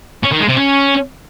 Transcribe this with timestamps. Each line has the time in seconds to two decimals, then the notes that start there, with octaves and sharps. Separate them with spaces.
0.23 C#4
0.32 D#3
0.40 G#3
0.48 C3
0.56 C#4